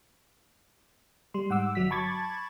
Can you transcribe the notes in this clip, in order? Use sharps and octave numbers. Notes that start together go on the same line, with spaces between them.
G3 C6
G#2 F#5 D6 E6
G1 F#3 B6
A5 B5 C#6 D6 G#6 A6